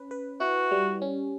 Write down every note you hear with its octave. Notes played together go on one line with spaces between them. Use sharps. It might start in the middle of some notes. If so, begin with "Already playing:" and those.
Already playing: C#4 B4
B4
E4 F#4
G3
C#4